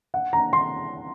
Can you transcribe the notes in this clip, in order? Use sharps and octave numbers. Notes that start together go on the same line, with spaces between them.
F#5
A#5
C6